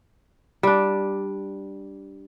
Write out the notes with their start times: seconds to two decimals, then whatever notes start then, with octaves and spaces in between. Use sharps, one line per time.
0.63 G3 D4